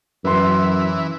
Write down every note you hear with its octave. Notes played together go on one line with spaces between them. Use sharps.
F#2 E3 B4 C6